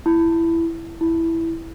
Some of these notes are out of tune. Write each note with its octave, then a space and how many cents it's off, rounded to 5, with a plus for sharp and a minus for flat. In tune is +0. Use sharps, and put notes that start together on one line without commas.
E4 +10
E4 +0